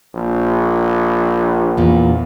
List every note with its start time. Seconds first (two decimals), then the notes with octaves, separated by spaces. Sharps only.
0.14 A#1
1.77 E2 A#2